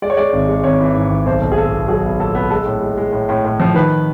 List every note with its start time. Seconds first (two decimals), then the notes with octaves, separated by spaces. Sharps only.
0.02 G#3 D5
0.10 C#5
0.17 G#3 D5
0.33 G#1
0.49 G#3
0.64 G#1 C#5
0.80 E3
0.95 G#2
1.10 G#1
1.26 B1 C5
1.41 B1
1.52 G#4
1.58 A#2 A4
1.73 B3
1.88 F#3 G#4
2.05 B3
2.19 A#2 A4
2.35 B3
2.50 G#3 A4
2.66 A2
2.82 G#3
2.97 G#3
3.12 A2
3.29 A2
3.44 A2
3.60 F3
3.74 D#3 B4